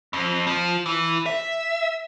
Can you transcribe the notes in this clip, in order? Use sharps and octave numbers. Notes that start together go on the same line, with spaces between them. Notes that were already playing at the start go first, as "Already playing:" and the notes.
F2
F3
E3
E5